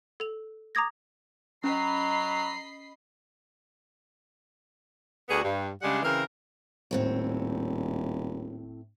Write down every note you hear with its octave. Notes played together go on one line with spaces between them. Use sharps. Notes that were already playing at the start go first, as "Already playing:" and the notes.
A4 F7
A#5 D6 D#6 G#6 A#6
F#3 C#4 D#5 A#5 B5 C7
D2 B3 D4 F#4 G#4
G2
C#3 G3 G#3 D4 F#5
C#3 E3 C4 A#4
D#1 A2 C4 C#5